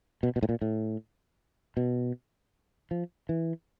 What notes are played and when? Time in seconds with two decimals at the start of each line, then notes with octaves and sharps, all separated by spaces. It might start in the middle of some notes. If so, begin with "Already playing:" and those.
0.23 B2
0.36 B2
0.43 A2
0.49 A#2
0.62 A2
1.77 B2
2.91 F3
3.29 E3